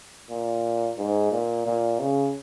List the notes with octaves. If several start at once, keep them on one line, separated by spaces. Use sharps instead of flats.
A#2
G#2
A#2
A#2
C#3